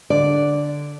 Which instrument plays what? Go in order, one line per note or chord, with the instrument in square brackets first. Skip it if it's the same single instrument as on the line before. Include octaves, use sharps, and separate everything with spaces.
[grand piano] D3 [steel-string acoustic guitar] D5